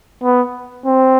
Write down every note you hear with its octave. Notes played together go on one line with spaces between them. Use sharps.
B3
C4